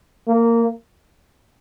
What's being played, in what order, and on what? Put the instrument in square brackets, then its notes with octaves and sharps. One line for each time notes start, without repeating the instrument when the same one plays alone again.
[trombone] A#3